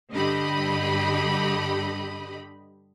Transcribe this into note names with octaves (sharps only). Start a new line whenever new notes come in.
G2 D3 G4 D#5 B5